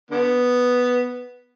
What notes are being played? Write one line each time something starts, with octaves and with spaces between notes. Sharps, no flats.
D3 B3